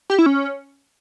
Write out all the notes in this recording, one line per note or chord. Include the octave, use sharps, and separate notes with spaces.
G4
E4
C#4